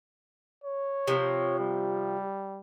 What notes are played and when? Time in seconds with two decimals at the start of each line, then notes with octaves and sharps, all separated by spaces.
0.64 C#5
1.07 C3 F3
1.60 G3